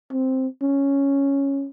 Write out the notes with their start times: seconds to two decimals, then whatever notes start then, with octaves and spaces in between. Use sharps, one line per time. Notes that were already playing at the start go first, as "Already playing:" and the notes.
0.12 C4
0.62 C#4